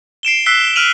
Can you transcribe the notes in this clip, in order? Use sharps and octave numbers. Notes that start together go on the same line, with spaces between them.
C7 D7 E7 G7
E6 F#6 B6 C7 G7
F6 D7 D#7 F7 F#7